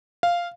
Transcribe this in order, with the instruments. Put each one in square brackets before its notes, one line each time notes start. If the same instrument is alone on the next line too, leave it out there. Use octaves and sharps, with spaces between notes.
[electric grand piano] F5